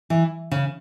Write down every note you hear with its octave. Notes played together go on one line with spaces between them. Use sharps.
E3
C#3